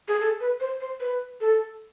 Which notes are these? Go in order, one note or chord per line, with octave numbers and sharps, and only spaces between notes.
G#4
A4
B4
C5
C5
B4
A4